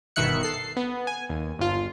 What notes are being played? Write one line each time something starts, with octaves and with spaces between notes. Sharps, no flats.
G1 B2 D#3 E5 F#6 C#7
A4 C7
B3
G#5
D#2
G1 F4